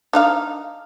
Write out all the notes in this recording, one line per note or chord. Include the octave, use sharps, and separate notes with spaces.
D4 D#4 F5